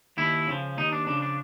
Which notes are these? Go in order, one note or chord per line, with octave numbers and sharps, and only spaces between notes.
D#2 E4
C#3 F3
D#2 D#4
D4
C#3 F3 D4
D4